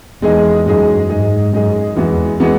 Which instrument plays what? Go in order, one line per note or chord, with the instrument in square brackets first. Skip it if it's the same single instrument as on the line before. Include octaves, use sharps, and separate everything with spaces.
[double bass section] E2 [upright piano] G#3 D#4 G#4
[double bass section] F#2 [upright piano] G#3 D#4 G#4
[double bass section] G#2 [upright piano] G#3 D#4 G#4
[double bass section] F#2 [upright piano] G#3 D#4 G#4
[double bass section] E2 [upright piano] E3 G#3 B3 F#4
[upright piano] E3 G#3 B3 F#4